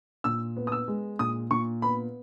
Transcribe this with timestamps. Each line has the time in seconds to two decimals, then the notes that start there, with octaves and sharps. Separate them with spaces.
0.24 A#2 E6
0.56 B3
0.67 D#6
0.72 E6
0.88 G#3
1.19 A#2 D#6
1.51 A#2 C#6
1.82 B3 B5